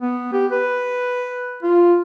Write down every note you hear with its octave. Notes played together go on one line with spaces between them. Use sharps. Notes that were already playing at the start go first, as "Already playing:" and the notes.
B3
G4
B4
F4